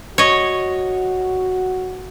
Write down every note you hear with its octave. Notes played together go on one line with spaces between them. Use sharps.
F#4 C#5 D#5